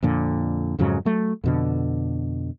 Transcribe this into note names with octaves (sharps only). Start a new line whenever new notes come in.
F2 A#2 D3
F2 G#2 C#3 F#3
F#3 A3
F2 B2 D3